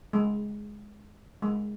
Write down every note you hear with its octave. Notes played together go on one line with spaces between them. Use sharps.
G#3
G#3